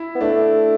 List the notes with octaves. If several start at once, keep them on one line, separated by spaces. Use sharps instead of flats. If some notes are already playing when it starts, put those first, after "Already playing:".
Already playing: E4
B3
A3 D4